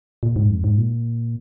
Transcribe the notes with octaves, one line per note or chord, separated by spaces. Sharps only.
A#2
G#2
F2
G#2
A#2